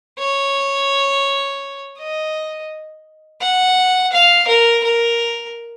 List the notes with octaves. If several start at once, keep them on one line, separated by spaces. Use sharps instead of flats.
C#5
D#5
F#5
F5
A#4
A#4